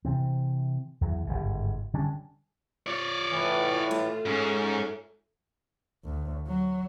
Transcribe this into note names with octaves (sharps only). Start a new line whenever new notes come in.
C3 E3 C4
E2 E3 F#3
G1 G#2 C#3
D3 G3 C#4 D4
F4 C#5 D5
A2 E3
A3
G#2 C#4
D2
F#3